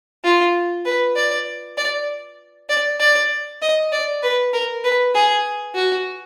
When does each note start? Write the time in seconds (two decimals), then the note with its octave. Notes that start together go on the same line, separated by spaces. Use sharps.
0.24 F4
0.85 B4
1.16 D5
1.77 D5
2.69 D5
3.00 D5
3.62 D#5
3.92 D5
4.23 B4
4.53 A#4
4.84 B4
5.15 G#4
5.75 F#4